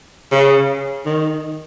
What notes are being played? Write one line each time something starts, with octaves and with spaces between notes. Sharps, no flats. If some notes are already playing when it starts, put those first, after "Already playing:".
C#3
D#3